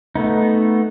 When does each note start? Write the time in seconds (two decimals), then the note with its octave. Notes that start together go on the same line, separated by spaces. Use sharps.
0.15 A3 B3 D#4